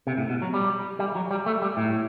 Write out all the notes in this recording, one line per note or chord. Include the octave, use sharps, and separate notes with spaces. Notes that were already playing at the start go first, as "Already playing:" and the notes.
C3
A2
B2
F#3
G3
G3
F#3
G3
A3
G3
A2